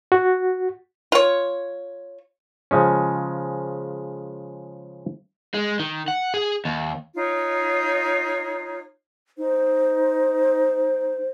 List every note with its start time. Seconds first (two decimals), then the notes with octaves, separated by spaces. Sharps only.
0.12 F#4
1.12 F4 C#5
2.71 C#3 F3 G#3 C#4
5.54 G#3
5.79 D#3
6.08 F#5
6.34 G#4
6.65 D#2
7.16 D#4 F4 C#5
9.38 D#4 C5